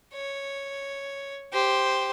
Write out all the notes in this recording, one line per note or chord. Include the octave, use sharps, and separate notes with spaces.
C#5
G4 C5